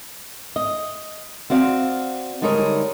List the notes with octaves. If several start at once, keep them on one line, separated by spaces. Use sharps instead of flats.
D#5
C4 F#4 D5 F5
D3 G3 G#3 D#4 A#4 C#5